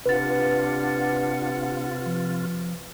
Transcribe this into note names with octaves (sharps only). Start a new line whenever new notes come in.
G1 C3 D4 F4 G4 B4 F#5 A6
F3